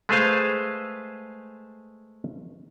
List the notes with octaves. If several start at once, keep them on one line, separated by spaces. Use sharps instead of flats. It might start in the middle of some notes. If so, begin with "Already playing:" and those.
G#3 A3 G#4 B4 C5 F5